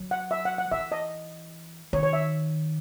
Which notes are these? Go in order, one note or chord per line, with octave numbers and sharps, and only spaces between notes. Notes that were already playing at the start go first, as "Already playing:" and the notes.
Already playing: F#3
F#5
E5
F#5
F#5
E3 E5
D#5
D#3 C#5
C#5
E5